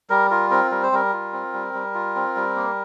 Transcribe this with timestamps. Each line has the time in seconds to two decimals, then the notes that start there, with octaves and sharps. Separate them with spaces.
0.10 G3 A#4
0.30 F4 A#4
0.50 C4 A#4
0.71 G3 A#4
0.83 C5
0.92 G3 A#4
1.13 F4
1.33 C4
1.54 G3
1.74 G3
1.94 F4
2.15 C4
2.36 G3
2.56 A#3